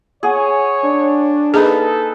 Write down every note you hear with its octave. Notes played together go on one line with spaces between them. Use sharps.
G#4 C#5 F#5 G#5
D4
A#3 D#4 G#4 A4 B4